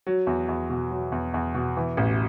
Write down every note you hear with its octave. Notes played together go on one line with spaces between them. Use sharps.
F#3
E2
E2
B2
F#3
E2
E2
B2
E3
A1